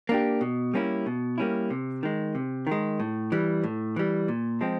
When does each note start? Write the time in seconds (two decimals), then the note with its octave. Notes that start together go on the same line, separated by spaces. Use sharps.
0.09 A#3 D4 G4
0.41 B2
0.74 G3 A#3 C#4 E4
1.06 B2
1.38 G3 A#3 C#4 E4
1.70 C3
2.03 D#3 G#3
2.35 C3
2.67 D#3 G#3
3.00 A2
3.32 E3 G3
3.63 A2
3.96 E3 G3
4.28 A#2
4.61 F3 G#3 C4